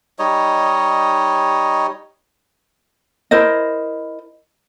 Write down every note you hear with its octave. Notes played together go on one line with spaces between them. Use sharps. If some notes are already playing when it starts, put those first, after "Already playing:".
G3 D#4 C#5 D#5
E4 A#4 C5 D#5